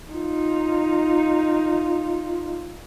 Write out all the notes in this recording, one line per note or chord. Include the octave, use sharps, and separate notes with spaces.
D#4 F4